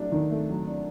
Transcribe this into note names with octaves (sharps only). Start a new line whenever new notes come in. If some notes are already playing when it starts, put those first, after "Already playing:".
Already playing: F#3 A3 D4
D#3
A3
F#3
D4